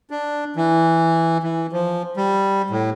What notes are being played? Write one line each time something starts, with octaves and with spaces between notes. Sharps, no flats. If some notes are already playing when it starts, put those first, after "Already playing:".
D4
E3
E3
F3
G3
A2